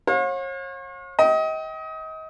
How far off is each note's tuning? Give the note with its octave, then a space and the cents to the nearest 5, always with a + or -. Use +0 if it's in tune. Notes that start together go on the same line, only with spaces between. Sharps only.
C#5 -40 F5 +45
D#5 +30 G5 -20